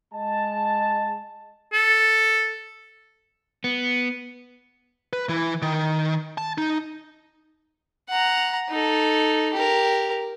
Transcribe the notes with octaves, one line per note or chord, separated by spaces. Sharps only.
G#3 A5
A4
B3
B4
E3 E4
D#3
A5
D#4
F#5 A#5
D#4 A4
G4 A#4